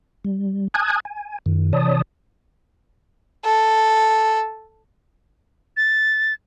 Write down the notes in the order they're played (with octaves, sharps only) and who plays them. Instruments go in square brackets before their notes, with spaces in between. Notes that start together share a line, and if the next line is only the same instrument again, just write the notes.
[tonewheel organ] G3
G#5 A5 D#6 F#6 G#6
G#5
F#2 D#3
C3 E3 C#5 D5 A5 D#6
[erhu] A4
[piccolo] A6